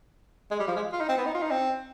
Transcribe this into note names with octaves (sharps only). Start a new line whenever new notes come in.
G#3
G3
F3
G#3
F4
D#4
C4
B3
D#4
F4
D#4
C4